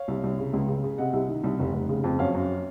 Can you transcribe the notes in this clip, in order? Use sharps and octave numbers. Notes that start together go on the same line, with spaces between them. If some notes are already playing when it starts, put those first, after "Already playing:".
Already playing: C#5 F5
C2
C2
C#3
C#2
C#3
C#3
C3 D#5 F#5
C2
D#3
C2
F1
F1
C#3
F2
F#2 C#5 F5
F#2